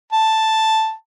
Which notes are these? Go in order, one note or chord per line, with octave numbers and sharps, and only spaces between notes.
A5